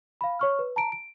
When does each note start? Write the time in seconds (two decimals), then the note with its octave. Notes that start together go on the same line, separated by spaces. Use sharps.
0.21 F5 B5
0.39 C#5 C#6 F6
0.59 B4
0.76 A5 A#5 D7
0.92 D7